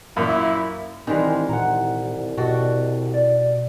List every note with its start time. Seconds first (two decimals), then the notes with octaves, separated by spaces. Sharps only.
0.16 F#2 A#2 E4
1.07 C2 D#3 E3 G#3 C4 D4 C5 D#5
1.49 A#2 F#5 A#5
2.37 B2 F#4 G4 A4 D5 D#5
3.14 D5